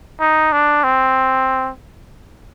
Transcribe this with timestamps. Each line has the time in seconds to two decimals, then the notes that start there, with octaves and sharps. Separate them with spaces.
0.20 D#4
0.52 D4
0.84 C4